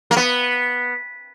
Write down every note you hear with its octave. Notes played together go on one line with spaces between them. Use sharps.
A#3
B3